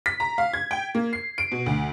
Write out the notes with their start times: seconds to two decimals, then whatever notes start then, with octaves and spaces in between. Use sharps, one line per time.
0.06 B6
0.20 A#5
0.38 F5
0.53 G#6
0.71 G5
0.95 A#3
1.13 C7
1.38 D7
1.52 B2
1.66 D2